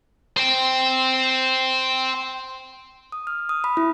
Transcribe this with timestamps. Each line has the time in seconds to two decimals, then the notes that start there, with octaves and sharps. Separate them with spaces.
0.37 C5 G5
3.12 D#6
3.27 F6
3.49 D#6
3.64 B5
3.77 E4